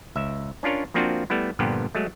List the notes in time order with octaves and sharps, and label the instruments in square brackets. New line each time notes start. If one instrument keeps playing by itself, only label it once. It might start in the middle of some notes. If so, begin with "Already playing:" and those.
[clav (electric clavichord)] C#2 E5
C#4 D4 F4 A#4 C#5
F3 A#3 C4 D4 F4 F#4
G3 A3 B3 E4
G2 A#2 D3 F3 B3 G4
F#3 G#3 A3